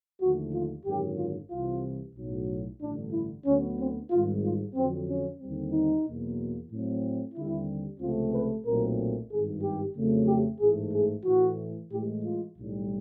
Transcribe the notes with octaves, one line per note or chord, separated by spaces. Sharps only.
D#2 D3 F3 A3 F#4
F4
G#1 F#2 D3 G4
F4
C2 C3 E3 F4
B1 A2 F#3
A1 G2 D3 D4
E4
D2 D3 F#3 B3 C#4
C4
G#1 G#2 D#3 G3 F4
F4
F2 D3 F#3 C4
C#4
D#2 D3 G3 C4
D#4
E2 B2 F#3 A#3
A2 F#3 A3 C4
D#2 D3 G3 C4 E4
C#2 C3 F3 A3 C4 F4
B4
B1 A#2 F#3 A3 C4 A#4
G#1 G2 D#3 G#4
G4
F2 C#3 F#3 A3 C4
G4
A1 G#2 E3 A3 G#4
G#4
A2 E3 A3 F#4
A2 E3 G#3 G4
F4
B1 A2 E3 G3